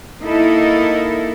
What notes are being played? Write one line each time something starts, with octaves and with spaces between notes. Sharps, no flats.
A#3 D#4 E4 A4 A#4